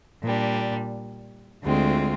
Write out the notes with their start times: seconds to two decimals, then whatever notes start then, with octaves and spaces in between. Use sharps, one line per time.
0.23 A#2 G3 D4
1.64 D2 D3 G#3 C4 F4